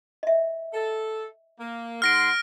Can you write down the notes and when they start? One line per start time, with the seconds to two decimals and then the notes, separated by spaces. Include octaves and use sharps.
0.23 D#5 E5
0.74 A4
1.60 A#3
2.02 G#2 F#5 C6 F6 A#6 D7